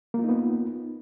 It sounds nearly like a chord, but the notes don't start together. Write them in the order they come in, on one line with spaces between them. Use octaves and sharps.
A#3 F4 D#4 B3